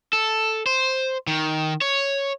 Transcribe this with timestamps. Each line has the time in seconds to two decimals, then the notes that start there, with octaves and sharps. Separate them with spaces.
0.13 A4
0.66 C5
1.27 D#3
1.81 C#5